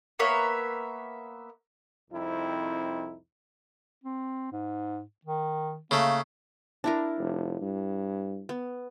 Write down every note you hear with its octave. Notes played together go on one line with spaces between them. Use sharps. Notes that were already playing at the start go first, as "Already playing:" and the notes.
A#3 B3 C#5 E5
C2 F2 C4 D#4 E4
C4
G#2
D#3
C#3 A3 A#3
D4 E4 A#4
F1
G2
B3